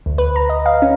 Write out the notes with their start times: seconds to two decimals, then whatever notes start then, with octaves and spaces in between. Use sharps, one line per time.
0.06 D2
0.18 B4
0.36 A#5
0.49 D#5
0.66 F5
0.82 C#4